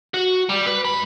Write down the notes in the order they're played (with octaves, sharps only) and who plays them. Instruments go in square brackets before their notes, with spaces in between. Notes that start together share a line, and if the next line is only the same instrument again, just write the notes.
[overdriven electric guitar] F#4
G3
B4
G#2 B5